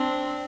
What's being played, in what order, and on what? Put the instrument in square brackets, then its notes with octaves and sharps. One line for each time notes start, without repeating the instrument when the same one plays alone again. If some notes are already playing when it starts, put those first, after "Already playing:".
Already playing: [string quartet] C4 D4